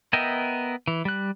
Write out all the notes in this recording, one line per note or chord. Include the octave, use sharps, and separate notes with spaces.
B3 A#4 D#5 E5 G5
E3
G3 F#6